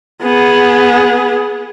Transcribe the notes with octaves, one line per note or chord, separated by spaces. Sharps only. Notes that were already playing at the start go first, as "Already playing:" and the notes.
B3 G#4